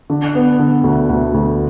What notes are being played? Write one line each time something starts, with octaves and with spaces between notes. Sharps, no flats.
D3
B3
D3
D2
D2
D2